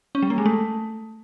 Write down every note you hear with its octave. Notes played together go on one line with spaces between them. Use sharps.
C#4
G3
A#3
G#3
A3